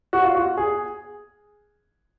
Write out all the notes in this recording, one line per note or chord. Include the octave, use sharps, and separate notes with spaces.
F#4
F4
F#4
G#4